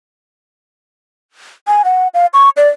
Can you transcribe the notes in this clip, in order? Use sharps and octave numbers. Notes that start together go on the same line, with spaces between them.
G#5
F#5
F5
C#6
D5